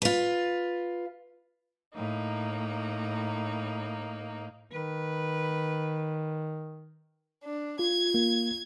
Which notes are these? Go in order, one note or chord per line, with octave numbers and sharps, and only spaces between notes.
F4 B4
A2 A#3 D#4
D#3 B4
D4
F4 G#6
A#3